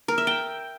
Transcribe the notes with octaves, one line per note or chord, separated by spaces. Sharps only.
A#4
E5
G5